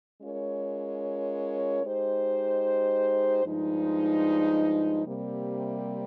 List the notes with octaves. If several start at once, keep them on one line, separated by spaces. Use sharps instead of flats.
G#3 C#4 F4 A#4 C#5
G#3 D#4 G4 C5
G2 F3 G#3 D#4
C3 G3 A#3